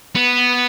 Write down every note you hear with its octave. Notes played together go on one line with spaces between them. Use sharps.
B3